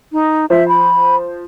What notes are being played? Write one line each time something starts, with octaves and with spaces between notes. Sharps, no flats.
D#4
F3 C5 E5
B5